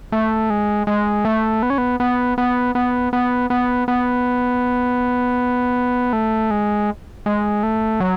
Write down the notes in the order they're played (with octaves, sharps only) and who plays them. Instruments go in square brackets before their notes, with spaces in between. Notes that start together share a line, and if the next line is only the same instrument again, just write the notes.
[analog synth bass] A3
G#3
G#3
A3
B3
C#4
B3
B3
B3
B3
B3
B3
B3
A3
G#3
G#3
A3
F#3